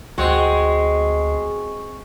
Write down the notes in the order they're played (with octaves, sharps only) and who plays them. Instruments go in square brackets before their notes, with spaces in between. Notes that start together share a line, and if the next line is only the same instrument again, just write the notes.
[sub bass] D2 [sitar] G#3 [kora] C4 F#4 [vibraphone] C#6